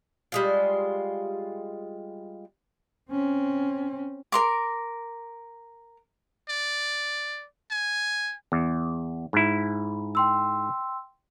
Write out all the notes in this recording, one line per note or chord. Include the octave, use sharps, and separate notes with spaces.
G3 G#3 F4
C4 C#4
A#4 C6 D6
D5
G#5
E2
G#2 E4
G5 C6 E6